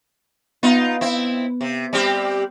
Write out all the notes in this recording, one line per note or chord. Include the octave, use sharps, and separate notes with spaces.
B3 D#4 F4
C4 E4
C3
G3 C4 G4